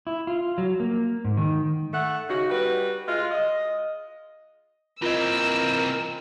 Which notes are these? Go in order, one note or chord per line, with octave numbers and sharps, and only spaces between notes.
E4
F4
F#3
A#3
G#2
D#3
A3 F#5
C#3 D#4 F#4
G3 F#4 B4
G#3 F4
D#5
E3 C4 F4 A#4 D#5 E6